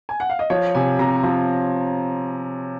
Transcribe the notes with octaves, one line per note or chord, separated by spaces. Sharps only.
G#5
F#5
F5
D#5
F3 C#5
C3 G#5
C3 A#5
F3